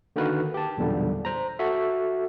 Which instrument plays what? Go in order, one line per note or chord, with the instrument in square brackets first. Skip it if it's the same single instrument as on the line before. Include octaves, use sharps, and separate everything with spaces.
[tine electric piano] D3 D#3 A#3 F#4 A#4 B4
G4 A5
B1 E2 A#2 D3 G3
C5 A#5
F#4 A4 E5